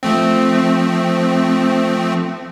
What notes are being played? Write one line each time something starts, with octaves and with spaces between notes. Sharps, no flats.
F3 A3 C4